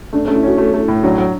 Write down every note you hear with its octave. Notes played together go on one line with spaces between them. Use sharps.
A3 D4
C#4
A3
E4
C#4 F#4
A3 F#4
A3
E4
A2
F#3 D4
F#3